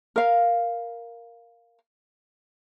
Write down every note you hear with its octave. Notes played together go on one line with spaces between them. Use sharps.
A#4 F5